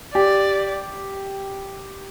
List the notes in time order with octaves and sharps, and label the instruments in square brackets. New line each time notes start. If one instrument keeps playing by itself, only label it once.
[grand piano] G4 [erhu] D5